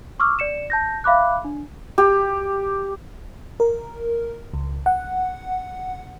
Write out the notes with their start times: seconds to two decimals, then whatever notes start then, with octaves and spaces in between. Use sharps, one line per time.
0.20 C#6 D6 E6 F6
0.39 D5 C#7 E7
0.70 A5 G6 A#6
1.04 E5 F5 B5 D6 F#6
1.45 D4
1.98 G4
3.60 A#4
4.54 C#2
4.86 F#5